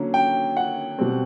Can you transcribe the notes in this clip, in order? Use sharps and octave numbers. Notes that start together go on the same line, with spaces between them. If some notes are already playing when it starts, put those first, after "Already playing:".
Already playing: D3 F#3 A#3 C#4
G5
F#5
B2 G3 C4